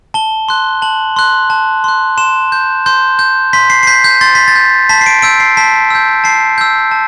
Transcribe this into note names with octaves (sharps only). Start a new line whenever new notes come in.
A5 G7
C6 F#6
A5 F#7
C6 F#6
A5
C6 F#6
C6 E7
G6
C6 G6
G6
C6 B6
C7
C7
G6 B6
G6
C6 A6
B6
A6
G6
A5 B6
C7
D7
E6 G6 D7
C7
A5 B6
E6 G6
A5 C7
E6 G6
A5